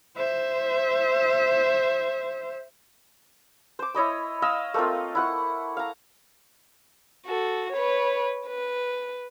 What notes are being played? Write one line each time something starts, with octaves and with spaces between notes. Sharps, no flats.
C5 E5
C5 D6
E4 C#5 D#5 B5
D#5 F5 E6
A3 A#3 C4 F4
E4 F#5 C#6
F5 A#5
F#4 A4
B4 C#5
B4